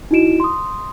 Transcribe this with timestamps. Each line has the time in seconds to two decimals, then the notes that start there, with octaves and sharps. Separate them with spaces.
0.11 D#4 E4 F#4 D#5 D7 E7
0.40 C6 D#6